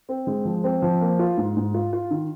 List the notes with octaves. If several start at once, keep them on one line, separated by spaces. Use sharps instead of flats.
C4
G#3
F3
C4
F3
A#3
F4
G#2
G#2
F4
F4
D#3